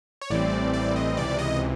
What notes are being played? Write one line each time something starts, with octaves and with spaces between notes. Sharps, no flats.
C#5
A1 A2 E3 G3 C4 D5
D5
D#5
C#2 C3 E3 D5
D#5